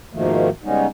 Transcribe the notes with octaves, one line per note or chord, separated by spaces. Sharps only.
G#2 B2 D#3 F3 A3 A#3
C#3 G3 G#3 B3 C#4 D#4